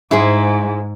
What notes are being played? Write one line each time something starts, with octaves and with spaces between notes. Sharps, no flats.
G#2 E4 G#4 C5